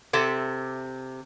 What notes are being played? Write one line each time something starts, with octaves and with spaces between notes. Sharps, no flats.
C3 A4 E5